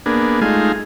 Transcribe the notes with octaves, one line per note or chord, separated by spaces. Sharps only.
A#3 B3 D4 G#4
G#3 A3 D#4 F4 G#4